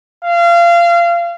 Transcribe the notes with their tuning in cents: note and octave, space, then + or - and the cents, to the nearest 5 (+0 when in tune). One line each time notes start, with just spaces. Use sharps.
F5 -25